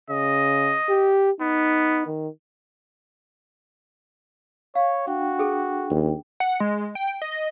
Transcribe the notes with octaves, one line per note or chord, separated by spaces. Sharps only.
C#3 D#5
G4
B3 D#4
D#3
C#5 F5
D4 F#4 G5
G#4 A4
D#2
F#5
G#3
G5
D#5